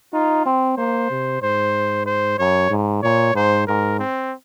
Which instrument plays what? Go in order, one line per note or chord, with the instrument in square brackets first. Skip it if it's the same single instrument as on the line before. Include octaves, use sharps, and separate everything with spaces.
[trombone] D#4 [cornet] F4
[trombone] C4
[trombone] A#3 [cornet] C5
[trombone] C3
[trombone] G#2 [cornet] C5
[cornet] C5
[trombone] F#2 [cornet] C#5
[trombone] G#2
[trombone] A#2 [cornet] C#5
[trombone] G#2 [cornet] C5
[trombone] G#2 [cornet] A#4
[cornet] C4